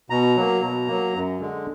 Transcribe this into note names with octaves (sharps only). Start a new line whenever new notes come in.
B2 A#5
F#3 A#3
B2
F#3 A#3
F#2
D3 G#3